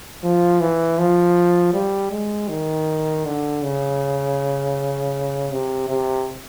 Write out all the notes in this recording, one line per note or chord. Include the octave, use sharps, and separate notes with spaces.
F3
E3
F3
G3
G#3
D#3
D3
C#3
C3
C3